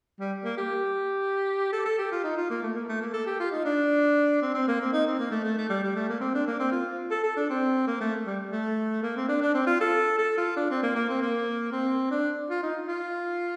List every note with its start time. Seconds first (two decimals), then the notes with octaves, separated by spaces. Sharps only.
0.19 G3
0.44 A#3
0.57 G4
1.72 A4
1.85 A4
1.98 G4
2.12 F4
2.24 D#4
2.37 F4
2.50 A#3
2.62 A3
2.75 A#3
2.89 A3
3.01 A#3
3.14 A4
3.26 G4
3.40 F4
3.51 D#4
3.65 D4
4.42 C4
4.54 C4
4.67 A#3
4.81 C4
4.93 D#4
5.06 C4
5.19 A#3
5.31 A3
5.44 A3
5.58 A3
5.69 G3
5.83 G3
5.96 A3
6.09 A#3
6.21 C4
6.34 D4
6.47 A#3
6.60 C4
6.72 F4
7.11 A4
7.23 A4
7.36 D4
7.50 C4
7.87 A#3
8.01 A3
8.26 G3
8.52 A3
9.03 A#3
9.16 C4
9.28 D4
9.42 D4
9.54 C4
9.67 F4
9.81 A4
10.18 A4
10.37 F4
10.57 D4
10.70 C4
10.83 A#3
10.95 A#3
11.09 C4
11.22 A#3
11.72 C4
12.11 D4
12.50 F4
12.63 D#4
12.88 F4